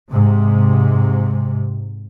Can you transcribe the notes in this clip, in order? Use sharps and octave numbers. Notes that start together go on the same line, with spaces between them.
G#2 C3